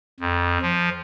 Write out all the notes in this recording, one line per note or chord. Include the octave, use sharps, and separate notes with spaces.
F2
F3